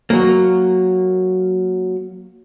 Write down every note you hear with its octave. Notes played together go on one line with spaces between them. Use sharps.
F#3 A#3